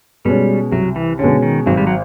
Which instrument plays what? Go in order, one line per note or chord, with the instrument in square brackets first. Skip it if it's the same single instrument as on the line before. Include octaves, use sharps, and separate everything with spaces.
[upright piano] B2 G#3 C#4 [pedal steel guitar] G3
[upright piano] C2 [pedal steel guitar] F#3
[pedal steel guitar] E3
[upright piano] B2 G#3 C#4 [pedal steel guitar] D3
[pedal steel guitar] D#3
[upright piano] G#1 [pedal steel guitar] F#3
[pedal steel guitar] G3
F#3